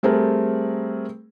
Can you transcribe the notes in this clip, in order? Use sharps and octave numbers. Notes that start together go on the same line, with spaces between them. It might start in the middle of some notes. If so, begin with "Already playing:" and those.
G3 A3 C4 G#4 A#4